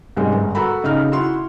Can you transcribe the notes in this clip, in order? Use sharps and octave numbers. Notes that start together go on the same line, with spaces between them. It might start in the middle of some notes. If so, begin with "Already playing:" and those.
C2 G#2 G#3 C#4
G1
F#4 A4 A#5 B5
C#3 D#4 F6
E4 F#4 C6